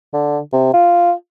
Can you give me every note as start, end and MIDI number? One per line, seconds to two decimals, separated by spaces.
0.13 0.39 50
0.53 0.72 48
0.73 1.12 65